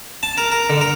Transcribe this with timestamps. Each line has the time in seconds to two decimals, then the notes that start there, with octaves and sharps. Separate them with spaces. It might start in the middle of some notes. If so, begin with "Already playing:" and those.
0.23 A5
0.37 A#4
0.52 A#4
0.70 D3
0.81 A#4